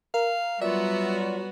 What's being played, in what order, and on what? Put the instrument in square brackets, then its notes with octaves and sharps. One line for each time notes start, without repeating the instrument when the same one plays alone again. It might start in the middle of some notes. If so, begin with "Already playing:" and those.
[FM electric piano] A#4 [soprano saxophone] F5
[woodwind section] F#3 F4 [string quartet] G3 B3 F#4 [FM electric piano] D5 [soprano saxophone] E5